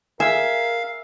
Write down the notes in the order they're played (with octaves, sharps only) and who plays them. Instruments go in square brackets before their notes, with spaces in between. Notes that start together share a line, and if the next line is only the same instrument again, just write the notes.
[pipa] G#4 G#5 [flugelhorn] A#4 [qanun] E5 [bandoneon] F5